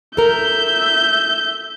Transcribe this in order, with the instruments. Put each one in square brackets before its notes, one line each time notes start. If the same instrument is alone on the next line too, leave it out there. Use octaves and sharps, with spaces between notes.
[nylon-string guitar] A4 A#4 [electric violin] E5 G6